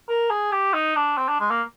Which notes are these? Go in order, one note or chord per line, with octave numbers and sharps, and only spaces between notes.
A#4
G#4
G4
D#4
D4
C4
D4
G#3
A#3